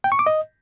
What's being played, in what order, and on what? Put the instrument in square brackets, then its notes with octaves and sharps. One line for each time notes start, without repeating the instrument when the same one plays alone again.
[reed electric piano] G5
C#6
D6
D#5